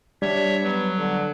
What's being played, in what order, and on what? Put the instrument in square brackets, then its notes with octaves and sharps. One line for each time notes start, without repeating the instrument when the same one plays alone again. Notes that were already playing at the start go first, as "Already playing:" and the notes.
[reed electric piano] G3 [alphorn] D4 [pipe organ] C#5 E5
[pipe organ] F#3 [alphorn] B3
[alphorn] D3